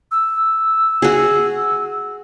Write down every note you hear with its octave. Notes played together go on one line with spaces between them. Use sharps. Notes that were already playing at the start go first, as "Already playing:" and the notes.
E6
F#4 G#4